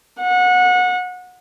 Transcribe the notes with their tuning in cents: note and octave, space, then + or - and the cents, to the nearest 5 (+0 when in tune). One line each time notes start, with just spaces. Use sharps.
F#5 -25